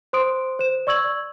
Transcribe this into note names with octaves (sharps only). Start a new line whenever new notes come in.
C5 C6 D#6 D7
C5 E7
D5 C#6 E6 G#6 F#7